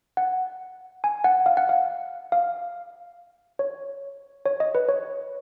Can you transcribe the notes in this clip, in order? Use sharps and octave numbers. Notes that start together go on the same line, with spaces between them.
F#5
G#5
F#5
F5
F#5
F5
F5
C#5
C#5
D#5
B4
C#5